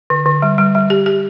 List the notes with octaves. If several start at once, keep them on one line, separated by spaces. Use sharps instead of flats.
D3
D3
G3
G3
G3
G4
G4